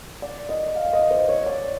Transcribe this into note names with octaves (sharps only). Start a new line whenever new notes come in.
D5
D#5
F5
D#5
C5
C#5
D5